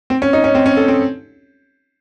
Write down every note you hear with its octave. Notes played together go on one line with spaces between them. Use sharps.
C4
C#4
D#4
C#4
C4
C#4
A4
C4